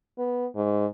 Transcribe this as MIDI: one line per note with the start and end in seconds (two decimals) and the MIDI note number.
0.18 0.46 59
0.55 0.87 44